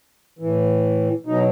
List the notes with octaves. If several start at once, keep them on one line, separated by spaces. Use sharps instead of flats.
A2 E3
B2 F#3 D#4